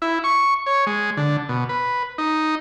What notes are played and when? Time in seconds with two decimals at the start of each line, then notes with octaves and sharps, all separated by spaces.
0.02 E4
0.24 C#6
0.66 C#5
0.87 G#3
1.17 D3
1.49 B2
1.69 B4
2.18 D#4